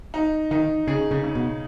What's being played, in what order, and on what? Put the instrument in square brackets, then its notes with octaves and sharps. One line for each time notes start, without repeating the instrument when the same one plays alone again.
[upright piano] D#4
[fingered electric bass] D#3 [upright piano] D#4
[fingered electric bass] C#3 [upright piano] G#4
[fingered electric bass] C#3
[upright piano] C#3
[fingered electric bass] B2